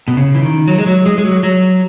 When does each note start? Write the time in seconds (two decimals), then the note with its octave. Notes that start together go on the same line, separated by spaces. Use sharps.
0.08 B2
0.17 C#3
0.35 E3
0.43 D#3
0.68 F#3
0.78 G#3
0.86 F#3
1.06 G#3
1.18 G#3
1.25 F#3
1.43 F#3